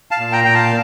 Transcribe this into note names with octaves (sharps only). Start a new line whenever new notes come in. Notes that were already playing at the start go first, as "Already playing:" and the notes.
F5 A5
A#2
G5 A#5
A#2 G5
F5 A5